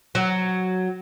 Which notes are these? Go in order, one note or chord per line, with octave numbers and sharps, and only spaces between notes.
F#3